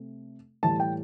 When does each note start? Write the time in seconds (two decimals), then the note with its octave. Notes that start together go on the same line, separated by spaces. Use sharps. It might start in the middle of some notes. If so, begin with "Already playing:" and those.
Already playing: C3 A3
0.63 A2 E3 G3 A5
0.80 G5